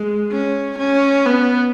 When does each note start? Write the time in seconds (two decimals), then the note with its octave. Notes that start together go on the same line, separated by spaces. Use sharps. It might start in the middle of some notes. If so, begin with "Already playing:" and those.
Already playing: G#3
0.31 C#4
0.79 C#4
1.25 B3